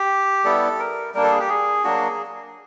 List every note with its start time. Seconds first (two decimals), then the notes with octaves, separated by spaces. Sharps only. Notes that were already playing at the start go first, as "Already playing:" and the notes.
Already playing: G4
0.44 G3 B3 E4 A4
0.79 A#4
1.14 G3 A#3 D4 A#4
1.23 A4
1.31 G#4
1.40 G4
1.49 G#4
1.84 F#3 A#3 D4 F#4